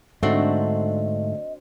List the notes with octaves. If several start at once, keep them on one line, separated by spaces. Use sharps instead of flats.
G#2 D3 A3 C4 D4 F#4 D#5